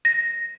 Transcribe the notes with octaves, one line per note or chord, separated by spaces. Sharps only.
A#6